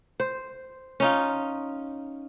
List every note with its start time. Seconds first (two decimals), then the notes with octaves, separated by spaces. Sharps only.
0.20 C5
1.00 C#4 D#4 F4